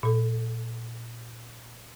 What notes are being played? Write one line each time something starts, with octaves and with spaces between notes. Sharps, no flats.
A#2 A4